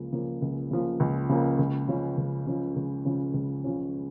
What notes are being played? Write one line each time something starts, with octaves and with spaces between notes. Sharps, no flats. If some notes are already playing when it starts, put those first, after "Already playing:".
Already playing: C#2 C#3 F3 A#3
C#3 F3 A#3
C#2
C#3 F3 A#3
C#2
C#3 F3 A#3
C#2
C#3 F3 C#4
C#2
C#3 F3 C#4
C#2
C#3 F3 C#4
C#2
C#3 F3 C#4